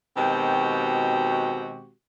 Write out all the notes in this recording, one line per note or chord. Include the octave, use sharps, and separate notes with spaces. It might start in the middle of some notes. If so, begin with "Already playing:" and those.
B2 D#3 G#3 C4 F#4 G4